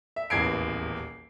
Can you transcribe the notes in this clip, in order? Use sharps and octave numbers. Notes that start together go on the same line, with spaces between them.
E5
D#1 A1 E2 G#6 C7 D7